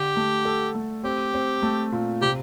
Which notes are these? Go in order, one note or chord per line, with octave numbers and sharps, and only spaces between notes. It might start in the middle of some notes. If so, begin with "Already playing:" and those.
Already playing: D3 G4
A3
A4
A3
C4 G4
C4
A3
A#2
C3 G4